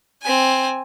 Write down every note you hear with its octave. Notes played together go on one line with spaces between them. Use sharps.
C4 G#5